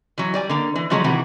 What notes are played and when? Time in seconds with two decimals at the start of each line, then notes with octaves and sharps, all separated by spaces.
0.18 E3 F#3
0.34 G3 D5 G#5
0.49 D3 A#3
0.76 E3
0.90 C#3 F3 F#3 G#3 A3 C#4
1.04 C3 D#3 E3 E4 F#4